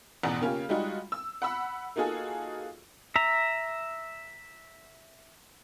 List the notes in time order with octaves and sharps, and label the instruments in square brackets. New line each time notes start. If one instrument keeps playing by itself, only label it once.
[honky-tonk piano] A1 E2 B2 D5 F#5 A#5
C#3 A#3 C#4 F4 G4
G3 G#3 D#4 F4 F#4
E6
F#5 B5 E6
A#3 D#4 F4 F#4 G#4 A4
[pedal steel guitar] E5 A#5